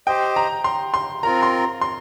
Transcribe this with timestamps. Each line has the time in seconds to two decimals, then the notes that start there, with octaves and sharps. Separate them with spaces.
0.07 G4 C5 D#5 G5
0.36 A#5
0.64 C6
0.94 C6
1.23 C4 F4 A#4 A#5
1.43 C6
1.81 C6